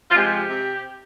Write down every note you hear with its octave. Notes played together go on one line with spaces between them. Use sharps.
F4
C3 F3 G#3 G4
C3